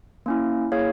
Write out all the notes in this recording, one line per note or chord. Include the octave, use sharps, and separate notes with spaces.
A#3 C#4 E4
A#3 E4 G#4 C#5 F5